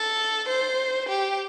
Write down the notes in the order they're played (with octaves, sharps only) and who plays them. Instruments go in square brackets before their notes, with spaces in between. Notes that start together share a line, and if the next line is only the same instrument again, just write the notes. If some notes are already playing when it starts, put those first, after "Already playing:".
Already playing: [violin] A4
C5
G4